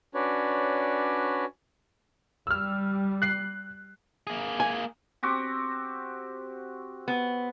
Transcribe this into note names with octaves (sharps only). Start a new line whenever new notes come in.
C#4 D4 F#4 B4 C#5 D5
G3 E6 F6
F#6 C7
A#3 G#4
G#5
C4 F#4 G4
B3